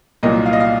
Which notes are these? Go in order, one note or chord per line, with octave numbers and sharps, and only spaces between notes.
C2 A#2 F#3 A#3 D#5
F5
D#5
F5